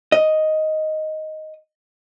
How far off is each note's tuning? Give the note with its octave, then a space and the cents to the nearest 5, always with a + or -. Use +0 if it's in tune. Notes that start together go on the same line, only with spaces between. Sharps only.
D#5 +5